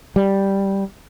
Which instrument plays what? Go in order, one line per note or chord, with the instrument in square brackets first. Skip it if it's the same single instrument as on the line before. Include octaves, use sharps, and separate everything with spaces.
[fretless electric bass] G3